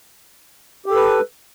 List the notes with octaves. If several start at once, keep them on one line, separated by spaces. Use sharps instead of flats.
G4 A4 B4